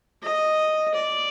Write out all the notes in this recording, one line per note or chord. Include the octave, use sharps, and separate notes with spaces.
D#5
D5